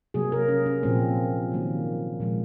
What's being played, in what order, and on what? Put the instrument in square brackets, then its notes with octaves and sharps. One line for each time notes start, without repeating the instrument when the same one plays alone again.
[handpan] C3 F#3 A#3 G#4
A#4
C#4
C#4
A#2 F3 A#3 C4
D#3 F#3 A#3
A#2 F3 G#3